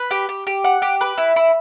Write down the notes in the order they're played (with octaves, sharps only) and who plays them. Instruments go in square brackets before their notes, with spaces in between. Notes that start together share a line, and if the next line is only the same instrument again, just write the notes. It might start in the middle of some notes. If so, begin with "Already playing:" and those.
Already playing: [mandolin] B4
G4
G4
G4
F#5
G4
B4
E4
E4